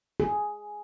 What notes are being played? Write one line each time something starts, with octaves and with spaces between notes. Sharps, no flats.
G#4